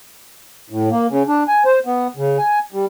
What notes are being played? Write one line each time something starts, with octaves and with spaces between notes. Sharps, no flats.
A2
A#3
C#3
D4
G#5
C5
B3
C#3
G#5
G3